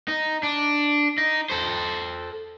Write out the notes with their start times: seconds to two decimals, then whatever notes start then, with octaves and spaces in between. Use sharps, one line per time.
0.08 D#4
0.43 D4
1.18 D#4
1.50 A4 C5